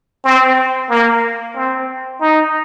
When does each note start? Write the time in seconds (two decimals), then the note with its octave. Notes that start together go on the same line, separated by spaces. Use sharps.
0.24 C4
0.89 A#3
1.55 C4
2.21 D#4